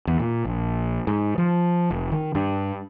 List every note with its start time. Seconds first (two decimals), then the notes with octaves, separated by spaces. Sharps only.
0.07 E2
0.20 A#2
0.45 A#1
1.07 G#2
1.38 F3
1.90 F1
2.12 D#3
2.35 G2